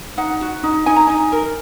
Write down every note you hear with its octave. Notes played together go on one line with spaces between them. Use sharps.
D#4 F#5
F#4
D#4
D#4 G#5
A#5
D#4 G#5
A#4